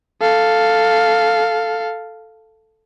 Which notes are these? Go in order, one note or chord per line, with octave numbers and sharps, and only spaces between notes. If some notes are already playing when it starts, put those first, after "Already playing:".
A4 F5